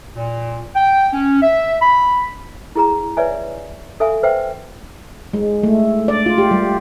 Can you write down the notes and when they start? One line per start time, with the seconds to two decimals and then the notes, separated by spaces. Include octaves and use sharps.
0.16 A#2
0.75 G5
1.13 C#4
1.42 E5
1.81 B5
2.75 E4 G#4 A#5
3.17 B4 C#5 D5 E5 G#5
4.00 A4 E5 F5 G#5
4.23 B4 C5 E5 F5 G5
5.34 G#3
5.63 A3
6.08 D5
6.26 F4
6.38 G4
6.51 G3